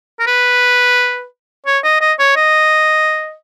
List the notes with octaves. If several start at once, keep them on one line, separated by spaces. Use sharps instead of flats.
A#4
B4
C#5
D#5
D#5
C#5
D#5